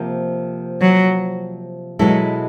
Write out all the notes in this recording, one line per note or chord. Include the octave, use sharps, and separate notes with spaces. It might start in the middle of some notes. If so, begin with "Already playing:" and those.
Already playing: C3 F3 A#3
F#3
B2 F#3 G#3 B3 E4 A4